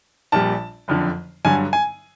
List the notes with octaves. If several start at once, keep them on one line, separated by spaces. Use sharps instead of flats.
A#1 A#2 G3 A5
F#1 F2 D3
G2 D3 F#3 G#5
G#5